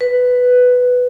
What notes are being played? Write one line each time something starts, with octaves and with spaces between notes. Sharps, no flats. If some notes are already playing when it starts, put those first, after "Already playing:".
B4